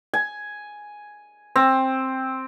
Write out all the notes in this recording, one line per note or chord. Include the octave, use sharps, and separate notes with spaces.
G#5
C4